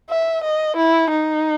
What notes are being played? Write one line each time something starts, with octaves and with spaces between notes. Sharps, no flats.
E5
D#5
E4
D#4